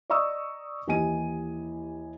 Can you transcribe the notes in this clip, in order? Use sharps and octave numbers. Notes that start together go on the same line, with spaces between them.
D5 D#5 A#5 C#6 D#6 E6
D#2 E3 G4 D#5 G#5 D#7